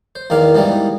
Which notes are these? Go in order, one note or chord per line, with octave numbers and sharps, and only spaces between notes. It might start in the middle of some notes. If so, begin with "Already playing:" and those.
C5
E2 D#3 A#3 F5 D6
G#2 E3 G3 A#3 B3